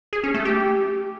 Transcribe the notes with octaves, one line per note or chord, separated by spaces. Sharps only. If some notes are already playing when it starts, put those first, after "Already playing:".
G#4
C#4
A3
G4